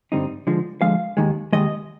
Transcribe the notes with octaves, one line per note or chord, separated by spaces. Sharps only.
G2 D3 G3 C4 D#4
D3 F3 G#3
D3 F3 G#3 F5
D#2 D#3 G#3
D#2 D#3 G#3 D#5